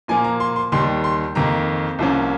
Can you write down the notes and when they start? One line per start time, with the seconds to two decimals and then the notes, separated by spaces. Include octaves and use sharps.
0.08 A#2 F3 A#3 G#5
0.24 A#5
0.40 C6
0.56 C6
0.72 D#2 D#3 G3 C6
1.04 C6
1.35 F2 D#3 A#3 A#5
1.99 C2 C3 F3 A#3 C#4